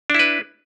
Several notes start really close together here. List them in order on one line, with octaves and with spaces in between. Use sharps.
D4 E4 B4